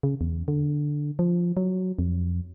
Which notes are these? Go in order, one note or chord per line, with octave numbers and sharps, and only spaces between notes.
C#3
E2
D3
F3
F#3
F2